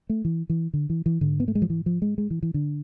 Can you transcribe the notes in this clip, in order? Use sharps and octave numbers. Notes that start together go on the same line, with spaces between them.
A3
E3
E3
D3
E3
E3
G#2 D3
B3
A3
G#3
F3
E3
F3
G#3
G#3
E3
E3
D3